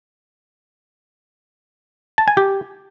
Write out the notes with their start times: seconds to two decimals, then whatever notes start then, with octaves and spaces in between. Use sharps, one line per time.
2.18 A5
2.28 G#5
2.37 G4